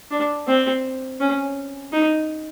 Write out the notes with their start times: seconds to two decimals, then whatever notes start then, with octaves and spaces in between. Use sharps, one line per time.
0.11 D4
0.47 C4
1.20 C#4
1.93 D#4